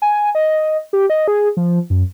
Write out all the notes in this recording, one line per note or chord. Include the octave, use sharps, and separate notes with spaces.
G#5
D#5
G4
D#5
G#4
F3
F#2